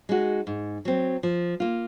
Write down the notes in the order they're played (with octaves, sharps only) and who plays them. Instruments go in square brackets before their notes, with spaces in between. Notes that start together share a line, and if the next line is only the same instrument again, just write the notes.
[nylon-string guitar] G#3 D#4 F#4
G#2
F#3 C4
F3
A#3 F4